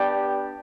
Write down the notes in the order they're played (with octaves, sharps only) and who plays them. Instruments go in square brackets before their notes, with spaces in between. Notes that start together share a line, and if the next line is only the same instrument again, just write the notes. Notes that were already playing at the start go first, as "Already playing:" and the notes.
Already playing: [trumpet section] B3 D4 G4 D5